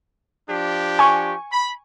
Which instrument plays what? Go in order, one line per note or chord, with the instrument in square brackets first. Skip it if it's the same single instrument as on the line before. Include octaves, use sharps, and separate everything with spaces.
[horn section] F3 D4 G4
[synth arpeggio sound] G#5 C#6
[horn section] B5